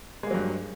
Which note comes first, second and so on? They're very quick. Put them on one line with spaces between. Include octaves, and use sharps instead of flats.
G#3 A#3 F#3 G2